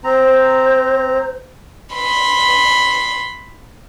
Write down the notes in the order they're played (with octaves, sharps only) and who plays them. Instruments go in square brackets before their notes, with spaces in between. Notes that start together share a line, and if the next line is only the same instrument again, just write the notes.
[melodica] C4 A#5 [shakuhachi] C5
[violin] B5 C6